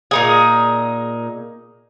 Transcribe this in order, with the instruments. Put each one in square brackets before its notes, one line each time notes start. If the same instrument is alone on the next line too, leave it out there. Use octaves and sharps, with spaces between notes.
[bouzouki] A#2 D#4 G#4